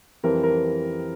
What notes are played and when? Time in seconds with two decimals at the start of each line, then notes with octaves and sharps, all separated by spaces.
0.23 F2 E3 G3 C4 A#4
0.43 A#4